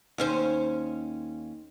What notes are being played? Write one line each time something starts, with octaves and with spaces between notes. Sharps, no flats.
D#2 C#4 C5